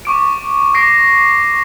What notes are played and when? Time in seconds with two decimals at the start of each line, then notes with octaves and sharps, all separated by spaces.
0.05 C#6 D6 D7
0.74 D6 A#6 C7 D7